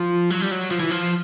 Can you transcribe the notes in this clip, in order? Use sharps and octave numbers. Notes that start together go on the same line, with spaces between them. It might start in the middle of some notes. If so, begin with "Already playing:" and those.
Already playing: F3
F#3
G3
F#3
F3
E3
F3